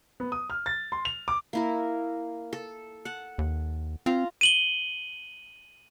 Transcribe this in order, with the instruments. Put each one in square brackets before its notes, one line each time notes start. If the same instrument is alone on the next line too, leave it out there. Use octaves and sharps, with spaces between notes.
[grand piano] B3
D#6
F6
A6
C6
F7
D6
[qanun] A#3 E4 A#4
A4
F#5 A5
[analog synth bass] D#2
[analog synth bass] C4 [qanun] F4 A#5
[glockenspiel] D#7 F#7 G7